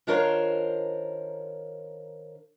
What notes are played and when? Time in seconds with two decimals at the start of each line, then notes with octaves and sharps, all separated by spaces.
0.07 D#3 D4 F4 A#4 C5 C#5